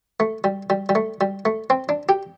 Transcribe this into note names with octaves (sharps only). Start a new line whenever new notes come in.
A3
G3
G3
G3
A3
G3
A3
C4
D4
G4